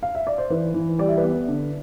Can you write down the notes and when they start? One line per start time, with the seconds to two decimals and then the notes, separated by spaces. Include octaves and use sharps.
0.03 F5
0.15 E5
0.27 D5
0.38 C5
0.50 E3 B4
0.74 E3
0.99 G3 D5
1.08 E5
1.18 B4 D5
1.23 B3
1.48 D3